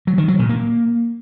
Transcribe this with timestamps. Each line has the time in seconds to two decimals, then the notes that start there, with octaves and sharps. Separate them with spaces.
0.07 F#3
0.18 D#3
0.28 F#3
0.39 A#2
0.49 A#3